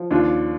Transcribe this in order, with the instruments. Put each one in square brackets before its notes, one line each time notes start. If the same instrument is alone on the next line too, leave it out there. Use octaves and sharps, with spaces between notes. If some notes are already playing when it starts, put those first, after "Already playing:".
Already playing: [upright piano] F3
D#2 D4 F4